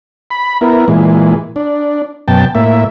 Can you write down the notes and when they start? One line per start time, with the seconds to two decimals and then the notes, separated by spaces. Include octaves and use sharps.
0.31 B5
0.61 B3 E4 A#4
0.88 A#2 E3 G#3
1.56 D4
2.28 F#2 B2 G5 A5
2.55 A2 A#3 E5